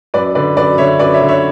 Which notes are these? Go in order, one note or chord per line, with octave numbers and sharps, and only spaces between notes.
F#2 B4 D5
D3 B4 D5
F#2 B4 D5
D3 C#5 E5
F#2 B4 D5
C#5 E5
D3
C#5 E5